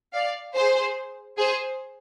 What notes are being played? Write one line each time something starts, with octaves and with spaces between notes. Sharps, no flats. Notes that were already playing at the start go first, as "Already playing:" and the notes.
D5 F5
G#4 C5
G#4 C5